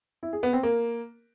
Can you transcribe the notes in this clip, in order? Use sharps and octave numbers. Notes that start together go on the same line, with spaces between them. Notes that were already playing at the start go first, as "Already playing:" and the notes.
E4
G#4
B3
C4
A#3